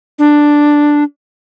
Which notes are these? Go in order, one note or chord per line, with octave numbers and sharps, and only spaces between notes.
D4